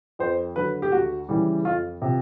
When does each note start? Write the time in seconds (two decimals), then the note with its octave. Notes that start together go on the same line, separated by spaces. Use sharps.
0.19 F2 C5
0.56 D3 F#3 B4
0.82 G4
0.92 D2 F#4
1.29 C#3 E3 G3
1.65 F2 F4
2.02 C3 F3